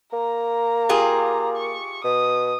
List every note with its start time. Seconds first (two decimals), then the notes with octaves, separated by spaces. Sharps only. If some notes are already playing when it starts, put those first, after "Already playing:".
0.13 A#3 A#5
0.89 F4 G4 G#4
1.56 C#6
2.04 B2 D#6